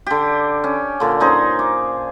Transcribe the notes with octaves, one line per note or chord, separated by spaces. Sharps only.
D3 G4
C#4
A#2 D3
C#4 D#4 G#4 C5
D6